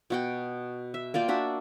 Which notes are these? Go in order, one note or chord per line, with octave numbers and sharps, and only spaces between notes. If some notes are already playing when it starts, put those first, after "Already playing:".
B2 F#4 G5
E5
A#3 F4 D5 G5
D4 F#4 E5